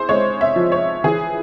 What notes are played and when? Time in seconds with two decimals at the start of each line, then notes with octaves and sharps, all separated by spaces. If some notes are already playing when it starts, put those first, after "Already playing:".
Already playing: E4 G#4 C5
0.09 G#3 C#5
0.41 E5
0.56 F3
0.72 C#5
1.04 E3 G#4